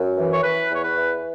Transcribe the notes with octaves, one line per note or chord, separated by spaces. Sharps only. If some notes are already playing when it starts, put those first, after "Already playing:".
Already playing: F#2
E3
C#5
E3 B4
E2 C#5
B4
E3